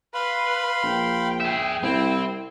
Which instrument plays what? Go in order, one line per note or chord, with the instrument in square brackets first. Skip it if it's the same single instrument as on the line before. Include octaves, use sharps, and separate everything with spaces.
[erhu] B4 [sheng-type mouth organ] F5 B5 C6
[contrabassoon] A#1 [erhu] G5
[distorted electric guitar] G#4 E5
[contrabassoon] C2 [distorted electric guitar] C4 [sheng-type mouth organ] E4